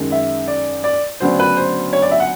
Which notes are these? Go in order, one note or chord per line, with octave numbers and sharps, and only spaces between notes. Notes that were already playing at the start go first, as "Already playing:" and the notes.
Already playing: F#2 D#3 G#3
E5
D5
D5
D2 C#3 F#3 B3 D4 C5
B4
C5
C#5
D5
E5
F#5